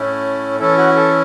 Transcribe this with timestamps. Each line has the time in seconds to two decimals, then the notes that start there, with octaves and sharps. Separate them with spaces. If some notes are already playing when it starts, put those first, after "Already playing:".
Already playing: A2 A3 C#4 E4
0.60 E3 C#4 E4 A4
0.78 F#4
0.96 A4